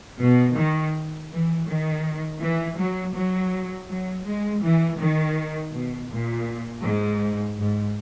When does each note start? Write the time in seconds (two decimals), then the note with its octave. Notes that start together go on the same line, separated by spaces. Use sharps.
0.21 B2
0.57 D#3
1.31 E3
1.68 D#3
2.41 E3
2.78 F#3
3.15 F#3
3.89 F#3
4.25 G#3
4.63 E3
4.99 D#3
5.73 B2
6.10 A#2
6.84 G#2
7.58 G#2